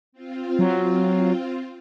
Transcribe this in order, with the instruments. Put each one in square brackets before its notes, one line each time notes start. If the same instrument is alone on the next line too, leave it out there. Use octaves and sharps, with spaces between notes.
[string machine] C4 F4
[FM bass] F#3